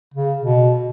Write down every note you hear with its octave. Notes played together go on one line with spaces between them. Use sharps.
C#3
B2